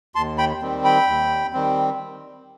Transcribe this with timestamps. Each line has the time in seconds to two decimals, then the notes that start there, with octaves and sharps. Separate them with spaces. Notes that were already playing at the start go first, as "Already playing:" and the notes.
0.15 D#2 A5 C6
0.38 G5 B5
0.62 D#3 G3 C4
0.84 G5 B5
1.07 D#2
1.53 D#3 G3 C4